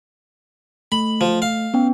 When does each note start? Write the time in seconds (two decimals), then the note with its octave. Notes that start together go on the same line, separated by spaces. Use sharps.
0.92 A3 B5
1.21 F3
1.42 F5
1.74 B3 C#4 G5